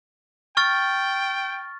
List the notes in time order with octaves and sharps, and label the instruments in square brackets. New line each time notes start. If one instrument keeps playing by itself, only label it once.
[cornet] G5 [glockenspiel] C#6 F6 A6